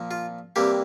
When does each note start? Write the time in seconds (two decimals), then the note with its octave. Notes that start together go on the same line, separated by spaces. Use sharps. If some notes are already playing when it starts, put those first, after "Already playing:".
Already playing: A#2 F3 A#3
0.11 F4
0.56 C3 E3 G3 A#3 G4